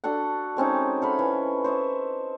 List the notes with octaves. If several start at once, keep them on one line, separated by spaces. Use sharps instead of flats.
D4 F#4 A4 F#5
G#3 C4 C#4 D#4
A4 F5 B5
E3
C5 C#5 D#5 E5